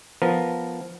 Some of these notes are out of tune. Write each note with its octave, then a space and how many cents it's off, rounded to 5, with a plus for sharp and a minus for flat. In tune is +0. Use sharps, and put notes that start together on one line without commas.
F3 +0 B3 -5 A#4 +0